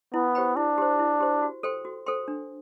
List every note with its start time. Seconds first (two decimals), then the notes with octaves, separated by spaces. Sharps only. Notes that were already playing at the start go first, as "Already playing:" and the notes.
0.14 B3 E4
0.35 G4 C5 G5 B5
0.56 D4 E4
0.78 G4 C5
0.99 E4
1.21 G4 C5
1.42 F#4
1.63 A4 C5 G5 C6
1.85 F#4
2.06 A4 C5 G5 C6
2.28 D4